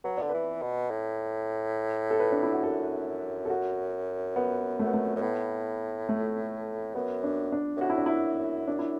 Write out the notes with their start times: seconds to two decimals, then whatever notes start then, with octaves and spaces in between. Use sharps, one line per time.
0.04 F#3 B4
0.18 D3 D5
0.29 E3 B4
0.62 B2
0.91 A2
2.11 A4
2.20 B4
2.32 D4
2.43 E4
2.53 F#4
2.63 F#2 A4
3.45 A4
3.50 F#4
4.36 B3
4.79 A3
4.87 B3
4.94 A3
5.16 F#2
5.22 A2 B3
6.09 A3
6.95 F#2 B3
7.24 D4
7.52 D4
7.77 F#2
7.81 A2 F#4
7.90 E4
7.98 D4
8.06 F#2 E4
8.39 F#2
8.68 F#2 D4
8.79 E4